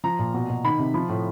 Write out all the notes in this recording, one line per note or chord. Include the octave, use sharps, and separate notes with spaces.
F3 A#5
A#2
B2
B2
D#3 B5
C3
F3 B5
A2